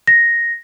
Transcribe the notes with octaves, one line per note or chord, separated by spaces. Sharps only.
A#6